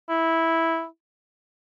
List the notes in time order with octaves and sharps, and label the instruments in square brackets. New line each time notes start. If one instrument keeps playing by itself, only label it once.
[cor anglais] E4